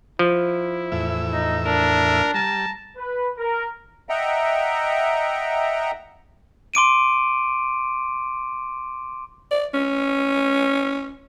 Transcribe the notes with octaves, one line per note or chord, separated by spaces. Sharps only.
F3 E4
E2 A2 E5
D#4
D4 A#4
G3 A5 A#5
B4
A#4
D#5 E5 F#5 G5 A#5
C6 D6 D7 D#7
D5
C#4